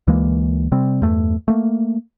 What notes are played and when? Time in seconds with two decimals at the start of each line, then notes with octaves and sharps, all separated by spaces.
0.07 D2 E3 G#3 A#3
0.72 C3 G3 C4
1.02 E2 G2 A3
1.48 A3 A#3